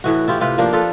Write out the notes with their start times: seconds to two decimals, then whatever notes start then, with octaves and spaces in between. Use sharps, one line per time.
0.04 A2 E3 F#4
0.28 E4 F4 G4
0.41 C3 F4 B4
0.58 F3 A#3 D4
0.73 F4 A4 B4